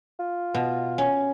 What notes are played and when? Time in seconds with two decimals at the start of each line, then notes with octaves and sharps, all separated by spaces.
0.19 F4
0.54 B2
0.98 C#4